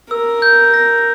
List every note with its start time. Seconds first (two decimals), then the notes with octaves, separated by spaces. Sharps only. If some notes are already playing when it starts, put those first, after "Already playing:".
0.11 A#4 E6
0.42 G6
0.74 A#6